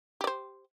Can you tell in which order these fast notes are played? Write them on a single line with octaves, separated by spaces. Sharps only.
G4 D5 C5